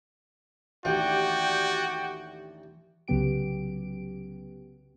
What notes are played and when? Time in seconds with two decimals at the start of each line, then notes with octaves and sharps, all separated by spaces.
0.85 A1 D#2 D4 F#4 G4 D5 G5
3.08 C2 C#3 F#3 B3 G4 D7